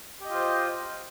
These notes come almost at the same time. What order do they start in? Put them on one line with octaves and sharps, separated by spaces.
G4 D#5 F4 C5